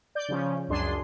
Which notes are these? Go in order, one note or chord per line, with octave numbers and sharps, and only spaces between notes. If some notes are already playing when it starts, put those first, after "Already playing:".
D5 G6
C#3 F3 C#4
C#2 F#2 D4 G#4 C6